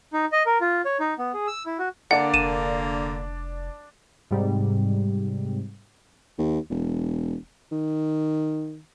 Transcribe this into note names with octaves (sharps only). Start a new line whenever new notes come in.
D#4
D#5
A#4
F4
C#5
D#4
B3
G#4
E6
E4
F#4
D3 A#3 D4 D5 F#5
F1 D#7 E7
G#2 C3 G3
D#2
E1
D#3